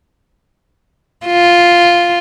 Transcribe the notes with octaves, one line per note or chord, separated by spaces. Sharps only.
F4